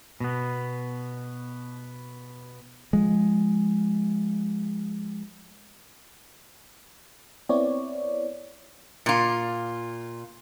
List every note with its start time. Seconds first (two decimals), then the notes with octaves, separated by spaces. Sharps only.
0.20 B2 B3
2.93 F3 G#3
7.49 B3 C4 E4 C#5 D5
9.06 A#2 F4